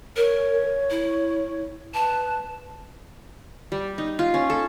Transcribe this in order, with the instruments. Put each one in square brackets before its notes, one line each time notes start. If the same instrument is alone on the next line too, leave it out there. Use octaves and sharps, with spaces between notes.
[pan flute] A#4 [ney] C#5
[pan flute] E4
[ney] B4 [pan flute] A5
[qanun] G3
D#4
F4
C#4
A4